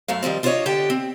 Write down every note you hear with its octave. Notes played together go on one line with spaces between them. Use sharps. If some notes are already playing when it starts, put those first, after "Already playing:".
F#2 F#3 A3 F5
D#3 F3 G3 C4
D4 F4 F#4 C5 C#5 D#5
D3 G4 G5 A5
C4